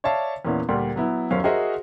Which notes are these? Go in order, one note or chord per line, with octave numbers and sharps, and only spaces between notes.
C#5 D5 E5 F5 A5
E2 A#2 B3 C#4 E4
D2 A#2 G3
F#3 B3 E4
D#1 F#2 C#4 C5 F5
F#4 G#4 A#4 C5 D#5 E5